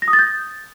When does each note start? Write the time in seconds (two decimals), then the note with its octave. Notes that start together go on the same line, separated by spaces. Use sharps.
0.02 A#6
0.08 D#6
0.13 A6
0.19 G6